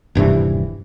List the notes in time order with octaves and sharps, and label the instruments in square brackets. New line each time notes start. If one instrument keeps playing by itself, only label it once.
[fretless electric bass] D#1 G2 C3 E3